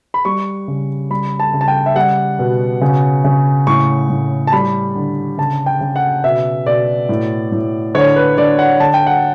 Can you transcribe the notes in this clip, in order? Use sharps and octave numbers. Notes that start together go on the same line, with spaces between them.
B5
G3 C#6
C#3
G3 B5
A5
C#3
A5
G5
E5
G3 F#5
B2
C#3
C#3
A2 C#6
A2
A5
G3 B5
D3
C#3 A5
G5
C#3
F#5
B2 E5
B2 D5
A2
A2
D3 C#5
B4
D3 D5
F#5
D3 A5
G5
F#5